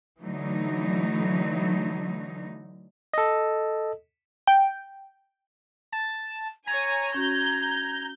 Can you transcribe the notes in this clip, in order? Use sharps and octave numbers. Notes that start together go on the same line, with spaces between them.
D3 E3 F#3 A3 D#4
A4 D#5
G5
A5
C#5 G#5 A#5 G#6
C#4 F#4 G6